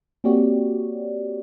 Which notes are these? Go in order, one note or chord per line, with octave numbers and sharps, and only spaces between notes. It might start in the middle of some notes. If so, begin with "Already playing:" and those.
A#3 C4 F#4 G4 C#5 D5